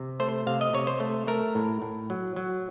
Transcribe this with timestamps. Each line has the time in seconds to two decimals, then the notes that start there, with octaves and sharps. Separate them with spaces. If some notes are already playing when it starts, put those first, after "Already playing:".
Already playing: C3
0.20 A3 C5
0.47 C3 F5
0.61 D#5
0.73 C3 C#5
0.87 C5
1.00 A3
1.27 A3 A#4
1.55 A2
1.82 A2
2.10 F#3
2.36 F#3